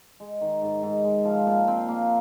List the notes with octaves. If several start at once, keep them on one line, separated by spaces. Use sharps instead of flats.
G#3
D#3
G#2
G#2
G#3
F3
A#2
C4
A#3